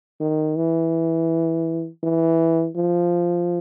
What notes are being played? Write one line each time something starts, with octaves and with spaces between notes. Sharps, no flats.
D#3
E3
E3
F3